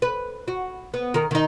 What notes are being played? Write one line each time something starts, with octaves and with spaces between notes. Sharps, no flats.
B4
F#4
B3
D#3 A#4
D#3 D#4